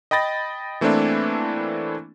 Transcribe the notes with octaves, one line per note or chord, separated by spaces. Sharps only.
D#5 G5 B5 A6 A#6
E3 A3 A#3 C4 D4 E4